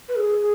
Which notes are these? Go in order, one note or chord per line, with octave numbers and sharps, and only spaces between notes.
B4
G#4